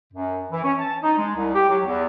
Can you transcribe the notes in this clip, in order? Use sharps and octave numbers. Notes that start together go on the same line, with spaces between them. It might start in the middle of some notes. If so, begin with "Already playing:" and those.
F#2
E3
C#4
A5
D#4
G#3
C2
G4
F#3
E2